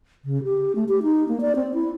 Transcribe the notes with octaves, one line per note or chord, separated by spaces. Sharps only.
C#3
G4
A3
G4
D#4
A#3
D5
C4
E4